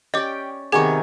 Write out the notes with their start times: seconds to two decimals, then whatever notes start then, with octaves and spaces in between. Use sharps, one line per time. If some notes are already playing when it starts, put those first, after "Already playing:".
0.14 C#4 G4 D5 D#5 G5 D6
0.72 C3 D#3 B3 G#4 C#5 G#5